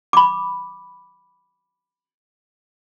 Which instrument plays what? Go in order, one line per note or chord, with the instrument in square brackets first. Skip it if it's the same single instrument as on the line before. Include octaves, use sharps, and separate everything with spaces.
[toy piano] B5 D6